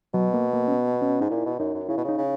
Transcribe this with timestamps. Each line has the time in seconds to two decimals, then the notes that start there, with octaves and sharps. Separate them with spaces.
0.14 B2 F#3
0.34 A#3
0.53 A#3
0.68 C#4
0.72 B3
1.02 C#4
1.21 G#2 D#4
1.30 A#2 E4
1.45 B2
1.59 F#2 D#4
1.74 F#2
1.89 C#3 E4
1.97 B2
2.04 C#3
2.09 D#4
2.18 C#3